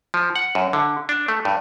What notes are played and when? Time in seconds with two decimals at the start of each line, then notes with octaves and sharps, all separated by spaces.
0.14 F3
0.36 F#5
0.55 F#2
0.73 D3
1.09 D4
1.28 A3
1.45 G2